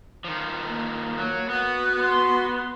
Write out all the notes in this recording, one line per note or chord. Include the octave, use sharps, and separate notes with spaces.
D#3 F3
A#3
F#3
B3 F#4
C6